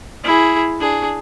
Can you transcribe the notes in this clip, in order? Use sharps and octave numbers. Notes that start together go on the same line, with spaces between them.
E4 G#4
D4 G#4